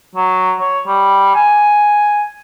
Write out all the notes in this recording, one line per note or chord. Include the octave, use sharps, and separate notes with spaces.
F#3
C#5
G3
G#5